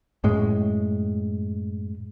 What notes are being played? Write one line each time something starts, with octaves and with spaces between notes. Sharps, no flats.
F#2 A2 G#3